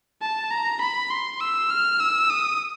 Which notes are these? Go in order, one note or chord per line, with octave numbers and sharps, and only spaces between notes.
A5
A#5
B5
C6
E6
F6
E6
D#6